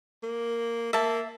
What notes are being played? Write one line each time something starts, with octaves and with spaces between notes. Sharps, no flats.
A#3
A#3 E5 A5